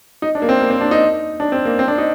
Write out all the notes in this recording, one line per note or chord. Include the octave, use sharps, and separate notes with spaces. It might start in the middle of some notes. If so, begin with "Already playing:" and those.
D#4
D4
A#3
C4
A#3
C4
D4
D#4
D4
C4
A#3
C4
D4
D#4